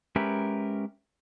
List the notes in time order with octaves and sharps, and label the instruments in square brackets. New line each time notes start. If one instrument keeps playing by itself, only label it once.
[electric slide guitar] G#3 C#4 G4 A#4 B4 E5